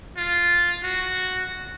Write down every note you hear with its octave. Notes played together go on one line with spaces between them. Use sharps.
F4
F#4